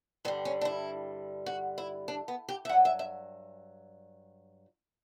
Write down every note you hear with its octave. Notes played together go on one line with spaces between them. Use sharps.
G2 D3 G3 B3
C#4
D4
E4
F#4
E4
D4
B3
G4
E5
G2 F#3 F#5
E5
E5